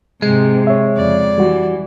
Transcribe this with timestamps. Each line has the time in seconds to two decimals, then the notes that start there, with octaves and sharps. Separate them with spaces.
0.22 G#2 C3 G#3
0.67 C#5 E5
0.97 F2 C#3 D5
1.38 E3 G3 F#4